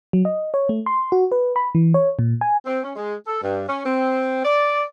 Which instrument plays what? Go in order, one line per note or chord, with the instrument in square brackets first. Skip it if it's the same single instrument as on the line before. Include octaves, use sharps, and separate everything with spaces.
[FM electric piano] F#3
D#5
C#5
A3
C6
F#4
B4
B5
E3
C#5
A#2
G#5
[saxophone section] C4
C#4
G#3
A4
G2
C#4
C4
D5